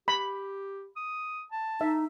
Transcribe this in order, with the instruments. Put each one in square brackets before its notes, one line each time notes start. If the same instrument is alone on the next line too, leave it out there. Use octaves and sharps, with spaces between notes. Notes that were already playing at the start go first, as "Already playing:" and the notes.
[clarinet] G4 [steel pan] B5
[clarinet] D#6
A5
[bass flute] D#4 [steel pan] E5